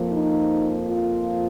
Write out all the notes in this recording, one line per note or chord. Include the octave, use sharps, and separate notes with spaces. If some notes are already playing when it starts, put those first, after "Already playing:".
Already playing: F2 F3 A#3
D#4
F4